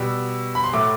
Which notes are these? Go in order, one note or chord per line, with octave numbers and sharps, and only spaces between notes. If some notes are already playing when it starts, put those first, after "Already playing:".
Already playing: B2 G3 E6
B5
C6
A2 F#3 A3 D6